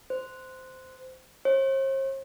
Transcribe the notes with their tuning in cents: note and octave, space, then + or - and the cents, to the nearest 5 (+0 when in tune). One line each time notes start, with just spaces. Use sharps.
C5 -15
C5 +45